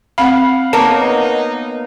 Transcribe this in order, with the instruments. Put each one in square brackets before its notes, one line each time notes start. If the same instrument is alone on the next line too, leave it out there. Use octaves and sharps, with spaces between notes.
[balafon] C4 B5 [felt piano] F5 F#5
[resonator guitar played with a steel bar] A#3 A#4 C#5 [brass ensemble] B3 D#4 [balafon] A5